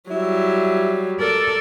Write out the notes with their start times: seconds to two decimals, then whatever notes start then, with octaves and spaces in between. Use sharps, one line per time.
0.10 F#3 G3 E4
1.21 A4 A#4 D5